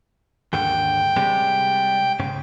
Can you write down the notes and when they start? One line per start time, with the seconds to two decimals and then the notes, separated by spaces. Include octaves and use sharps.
0.53 D#2 G#2 D3 G5
1.16 C3 G3 G#3
2.20 G#2 C#3